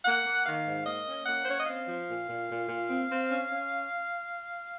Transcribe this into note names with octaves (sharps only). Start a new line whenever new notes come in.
A#3 F#5
A#3
D#3 F5
G#2
A#3 D#5
C#4
A#3 F#5
C5
C#4 C#5
D#5
C4 F5
F3
A#2
A#2
A#2
A#2
C4
C4
C#4
C#4